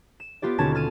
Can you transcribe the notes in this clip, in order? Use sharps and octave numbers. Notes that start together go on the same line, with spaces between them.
E7
B3 F4 G4 D5
D#2 B2 D3 C#4 A5 G#6
A5 F6 D#7